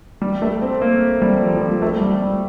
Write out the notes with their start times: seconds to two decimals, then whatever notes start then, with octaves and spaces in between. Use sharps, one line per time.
0.22 G3
0.42 A3
0.62 C4
0.81 A#3
1.22 G3
1.42 F3
1.56 F3
1.61 G3
1.82 A3
2.02 G3
2.22 G3